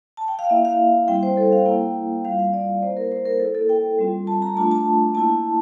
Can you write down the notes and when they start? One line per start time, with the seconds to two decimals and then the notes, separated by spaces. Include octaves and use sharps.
0.17 A5
0.28 G5
0.39 F5
0.49 A#3 E4 E5
0.65 F5
1.08 G3 C4 E4 G5
1.23 C5
1.37 A4
1.52 F5
1.66 A#3 E4 G5
2.24 G3 C4 F4 F5
2.39 F5
2.53 D5
2.83 A#3 E4 C5
2.97 A#4
3.12 C5
3.25 A#4
3.40 A#3 E4 A4
3.55 A4
3.69 G5
3.98 G3 C4 F4
4.27 A5
4.42 A#5
4.56 A3 D4 F4 A5
4.71 A5
5.14 A#3 E4 A5